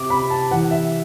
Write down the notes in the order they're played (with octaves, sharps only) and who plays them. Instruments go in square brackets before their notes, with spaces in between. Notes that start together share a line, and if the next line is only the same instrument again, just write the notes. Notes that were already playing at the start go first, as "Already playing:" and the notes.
Already playing: [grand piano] C3 D6
C3 B5
A5
E3 F#5
E5